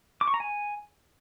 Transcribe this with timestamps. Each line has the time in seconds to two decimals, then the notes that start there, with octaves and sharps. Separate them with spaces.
0.21 D6
0.28 C#6
0.34 A#5
0.40 G#5